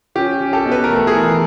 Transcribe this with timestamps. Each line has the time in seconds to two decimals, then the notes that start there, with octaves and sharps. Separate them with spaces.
0.15 C#4 G4
0.40 C#4
0.53 G4 A4
0.65 B2
0.71 B4
0.84 A#4
0.91 A3 A4
1.07 G#4 A#4
1.15 E3